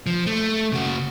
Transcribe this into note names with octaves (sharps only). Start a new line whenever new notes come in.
F3
A3
C#3 F#4